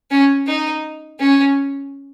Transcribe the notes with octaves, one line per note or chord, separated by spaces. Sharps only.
C#4
D#4
C#4